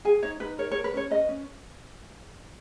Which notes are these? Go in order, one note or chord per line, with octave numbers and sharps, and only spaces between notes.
G#4 G#5
D#4 C#5
D#4 B4
A#4 C#5
C#5
A#4
B4
C#4 C#5
B4 D#5
C#4